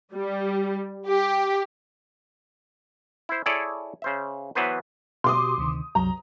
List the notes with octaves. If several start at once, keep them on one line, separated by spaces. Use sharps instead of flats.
G3
G4
E4 C5
E4 G#4 A4 C#5 D5
C#3 C5 E5
E3 F#3 B3 B4 C5
B2 F#4 G4 C6 D6 D#6
D2 C3 D#3
C2 F#2 F#3 A#5